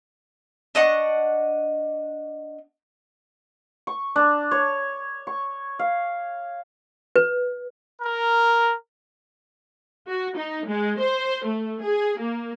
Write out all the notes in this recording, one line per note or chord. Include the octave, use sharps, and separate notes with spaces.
D4 D#5 F#5 C#6
C#6
D4
C#5
C#6
F5
B4
A#4
F#4
D#4
G#3
C5
A3
G#4
A#3